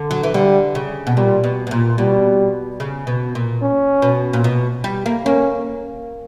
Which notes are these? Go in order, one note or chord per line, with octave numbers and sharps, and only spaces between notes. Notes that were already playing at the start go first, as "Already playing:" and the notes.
Already playing: D3
F#3
E3
D3 G3
C#3
B2
A#2 G3
B2
B2
A#2
B2 G3
C#3
B2
A#2
C#4
B2
A#2
B2
G3
A#3
A#3 C#4